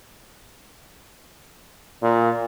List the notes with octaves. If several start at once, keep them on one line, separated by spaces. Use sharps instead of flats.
A#2